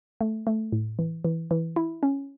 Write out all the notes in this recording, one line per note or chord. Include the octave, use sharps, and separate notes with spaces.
A3
A3
A2
E3
E3
E3
E4
C#4